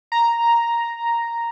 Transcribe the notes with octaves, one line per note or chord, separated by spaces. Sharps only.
A#5